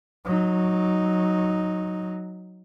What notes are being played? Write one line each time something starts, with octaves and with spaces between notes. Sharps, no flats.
F#3 D#4